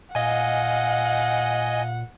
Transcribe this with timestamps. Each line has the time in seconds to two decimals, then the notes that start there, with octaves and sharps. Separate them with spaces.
0.15 A#2 D#5 F5 F#5 G#5